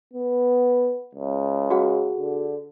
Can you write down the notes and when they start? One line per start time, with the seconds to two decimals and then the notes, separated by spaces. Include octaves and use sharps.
0.14 B3
1.15 C#2
1.70 F#4 G#4 F#5
2.19 D3